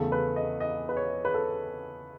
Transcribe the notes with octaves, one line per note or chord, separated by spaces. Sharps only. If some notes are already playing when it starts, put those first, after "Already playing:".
Already playing: E2 C#3 E3 A3 A4
B4
D#5
D#5
B4
C#5
B4
A4